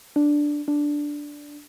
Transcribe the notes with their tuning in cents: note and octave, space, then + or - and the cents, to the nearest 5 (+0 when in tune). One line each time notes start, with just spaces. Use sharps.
D4 +0
D4 -5